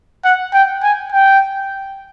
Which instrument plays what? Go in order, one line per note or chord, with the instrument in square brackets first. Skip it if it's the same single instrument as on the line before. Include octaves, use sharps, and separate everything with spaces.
[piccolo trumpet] F#5
G5
G#5
G5